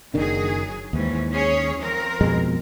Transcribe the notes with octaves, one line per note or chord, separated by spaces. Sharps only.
F#1 D#3 F#3 D4 G#4
D#2 G#2 E3 C#4
C#4 G#4 C#5
F3 C4 A#4
F2 B2 G#3